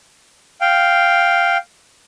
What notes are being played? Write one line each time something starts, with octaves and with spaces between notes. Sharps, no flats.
F5 G5